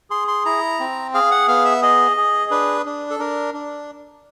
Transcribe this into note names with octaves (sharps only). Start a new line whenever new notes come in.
G#4 C6
C6
E4 A#5
C4
G#4 F5
F#5
B3 F5
E5
G#4 D#5
G#4
D4 B4
D4
A4
D4 A#4
D4